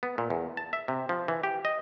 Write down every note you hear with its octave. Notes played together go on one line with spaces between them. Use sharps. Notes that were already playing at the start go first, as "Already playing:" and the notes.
B3
A#2
E2
A5
E5
C3
F3
E3
G4
D#5